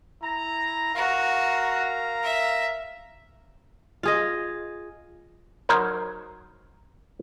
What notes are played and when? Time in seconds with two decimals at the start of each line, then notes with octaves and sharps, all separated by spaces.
0.22 E4 A#5
0.96 F#4 A#4 F5 A#5
2.23 E5
4.03 F4 G#4 D#5
5.69 F#3 D#4 A#4 C5 C#5